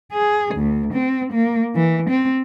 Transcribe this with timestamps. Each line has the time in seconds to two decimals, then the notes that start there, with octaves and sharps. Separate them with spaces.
0.12 G#4
0.55 D2
0.94 C4
1.33 A#3
1.75 E3
2.10 C4